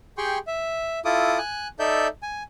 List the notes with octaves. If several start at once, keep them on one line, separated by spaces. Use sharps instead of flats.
G4 G#4 G5 C6 C#6
E5
E4 F4 A4 D6 D#6
G#5 F#6
D#4 A4 D5 E5 G6
G#5